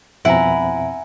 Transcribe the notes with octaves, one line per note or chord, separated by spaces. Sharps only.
F2 B2 C4 E4 F#5 G#5 A#5